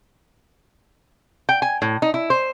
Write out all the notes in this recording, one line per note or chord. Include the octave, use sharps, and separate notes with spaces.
G5
G#5
A2
D#4
E4
C5